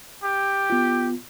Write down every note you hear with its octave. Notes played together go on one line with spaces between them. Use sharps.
G4
B3 F4